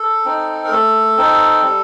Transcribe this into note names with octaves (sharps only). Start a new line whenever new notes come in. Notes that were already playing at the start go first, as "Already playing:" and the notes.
Already playing: A4
C4 D#4
A#4
A3 A4
C4 D#4
G3